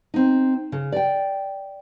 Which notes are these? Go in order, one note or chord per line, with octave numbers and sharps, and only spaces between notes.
C4 D#4
C#3
D5 G5